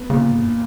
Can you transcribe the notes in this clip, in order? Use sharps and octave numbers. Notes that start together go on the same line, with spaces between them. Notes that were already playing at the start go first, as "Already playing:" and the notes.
Already playing: B3
A#2 C#3
G#2
G2